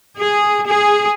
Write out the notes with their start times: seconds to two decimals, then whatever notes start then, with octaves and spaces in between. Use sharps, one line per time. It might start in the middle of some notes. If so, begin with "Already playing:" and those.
0.19 G#4
0.66 G#4